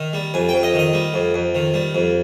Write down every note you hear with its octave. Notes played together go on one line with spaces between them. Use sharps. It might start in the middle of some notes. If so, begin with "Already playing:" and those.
Already playing: D#3
G3
F2 G#5
G5
F2
D#5
D#3 D#5
G3
F2
F2
D#3
G3
F2